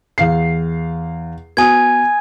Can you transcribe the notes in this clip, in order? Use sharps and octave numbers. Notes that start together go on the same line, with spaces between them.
E2 F5 C7
B3 F#4 G#5 D#6 G#6